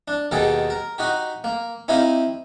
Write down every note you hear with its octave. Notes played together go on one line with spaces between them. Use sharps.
D4
D#2 B2 D#3 G#4 A4 G5
A#4
D#4 F#4 G4
A#3
C4 D#4 E4 G4 D#5 F5